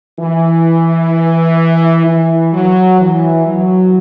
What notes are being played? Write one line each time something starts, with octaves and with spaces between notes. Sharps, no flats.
E3
E3
F#3
E3
F#3